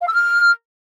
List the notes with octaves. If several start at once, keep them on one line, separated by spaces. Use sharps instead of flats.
F5
E6
F6